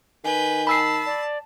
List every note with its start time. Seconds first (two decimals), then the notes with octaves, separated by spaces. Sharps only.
0.24 D#3 B4 G#5 G6
0.67 A5 B5 E6 C7
1.06 D5